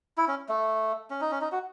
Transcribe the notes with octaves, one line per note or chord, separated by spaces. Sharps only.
E4
C#4
A3
C#4
D#4
C#4
D#4
F#4